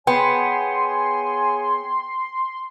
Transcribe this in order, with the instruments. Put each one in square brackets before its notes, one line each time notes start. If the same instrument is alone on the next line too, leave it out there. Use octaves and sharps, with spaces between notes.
[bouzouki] B3 [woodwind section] G#4 C#5 G#5 [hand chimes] G5 [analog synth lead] C6